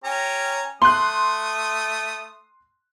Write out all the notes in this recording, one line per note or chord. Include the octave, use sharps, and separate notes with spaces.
C#4 G4 A#5
A3 C6 D#6 F#6